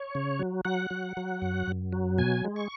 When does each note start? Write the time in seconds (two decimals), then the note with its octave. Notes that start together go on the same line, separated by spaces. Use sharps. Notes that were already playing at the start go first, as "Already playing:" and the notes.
Already playing: C#5
0.15 C#3
0.39 F#3
0.65 F#3 F#5
0.90 F#3
1.17 F#3
1.42 F#2
1.67 F#2
1.93 F#3
2.18 B2 G#5
2.44 G#3
2.56 C#6